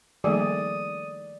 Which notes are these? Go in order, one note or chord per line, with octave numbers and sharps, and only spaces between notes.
D#3 F3 G3 A3 A#3 G#4 D5 D#6